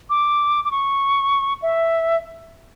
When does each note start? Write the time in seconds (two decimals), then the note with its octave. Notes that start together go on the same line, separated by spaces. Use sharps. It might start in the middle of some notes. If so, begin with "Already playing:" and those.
0.10 D6
0.65 D6
0.71 C#6
1.62 E5